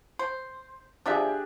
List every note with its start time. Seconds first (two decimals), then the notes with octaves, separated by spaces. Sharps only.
0.19 C5
1.06 F3 A#3 D4 G4 G#4 E5